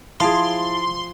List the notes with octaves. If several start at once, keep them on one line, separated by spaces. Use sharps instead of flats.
F3 E4 G#4 F5 A5 C6 D7